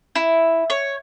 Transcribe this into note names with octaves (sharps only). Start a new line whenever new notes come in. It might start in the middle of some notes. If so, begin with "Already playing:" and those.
E4
C#5